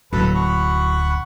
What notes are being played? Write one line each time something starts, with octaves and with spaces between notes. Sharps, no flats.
D1 F#2 F#3 A#3 A4 B4
F#5 B5 C#6